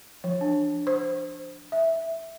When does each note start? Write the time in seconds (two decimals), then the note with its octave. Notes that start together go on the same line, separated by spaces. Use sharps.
0.24 F3
0.41 D4
0.87 C5
1.72 E5